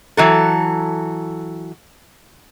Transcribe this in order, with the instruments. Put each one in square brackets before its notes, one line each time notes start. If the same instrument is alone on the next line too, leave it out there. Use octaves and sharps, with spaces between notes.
[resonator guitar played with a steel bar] E3 F#3 A4